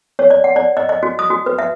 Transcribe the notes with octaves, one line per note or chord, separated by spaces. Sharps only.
C#5
D5
F#5
D5
D#5
D#5
F#4
D#6
F#4
B4
E5